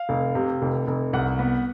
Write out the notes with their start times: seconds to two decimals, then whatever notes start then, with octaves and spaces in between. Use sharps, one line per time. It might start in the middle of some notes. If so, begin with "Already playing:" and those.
Already playing: F5
0.09 F1
0.35 C3
0.62 F1
0.87 F1
1.13 C2 F#5
1.39 B3